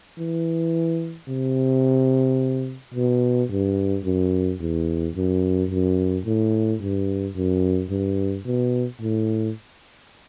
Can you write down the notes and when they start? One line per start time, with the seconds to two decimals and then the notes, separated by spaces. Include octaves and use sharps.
0.19 E3
1.28 C3
2.94 B2
3.50 G2
4.05 F#2
4.60 E2
5.15 F#2
5.70 F#2
6.25 A2
6.80 G2
7.35 F#2
7.90 G2
8.46 B2
9.02 A2